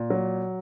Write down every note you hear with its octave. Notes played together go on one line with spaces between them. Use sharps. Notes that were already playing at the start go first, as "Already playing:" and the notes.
Already playing: A#2
F#3